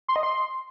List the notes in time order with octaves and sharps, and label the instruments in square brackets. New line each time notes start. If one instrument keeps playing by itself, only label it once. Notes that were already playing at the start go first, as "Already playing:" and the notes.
[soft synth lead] C6
D#5
C6